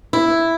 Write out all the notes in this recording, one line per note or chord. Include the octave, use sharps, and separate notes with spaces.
E4